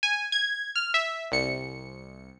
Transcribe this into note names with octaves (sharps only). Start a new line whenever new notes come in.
G#5
G#6
F6
E5
C2 C#7